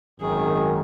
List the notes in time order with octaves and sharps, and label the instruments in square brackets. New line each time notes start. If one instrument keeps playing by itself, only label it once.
[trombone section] G#1 F#2 D#3 [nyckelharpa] G#4